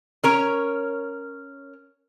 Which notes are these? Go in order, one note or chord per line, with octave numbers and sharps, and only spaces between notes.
C#4 A#4 C#5